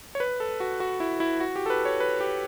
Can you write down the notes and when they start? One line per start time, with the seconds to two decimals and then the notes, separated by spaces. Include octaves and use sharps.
0.15 C#5
0.20 B4
0.40 A4
0.60 F#4
0.80 F#4
1.00 E4
1.20 E4
1.40 F#4
1.56 G4
1.66 A4
1.70 B4
1.85 C#5
2.00 B4
2.21 G4